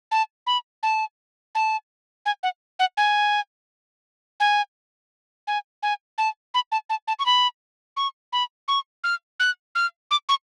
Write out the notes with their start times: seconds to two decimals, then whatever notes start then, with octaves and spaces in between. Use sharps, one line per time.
0.11 A5
0.47 B5
0.83 A5
1.55 A5
2.26 G#5
2.43 F#5
2.79 F#5
2.97 G#5
4.40 G#5
5.47 G#5
5.83 G#5
6.18 A5
6.54 B5
6.72 A5
6.90 A5
7.08 A5
7.19 C#6
7.26 B5
7.97 C#6
8.33 B5
8.68 C#6
9.04 F6
9.40 F#6
9.75 F6
10.11 D6
10.29 C#6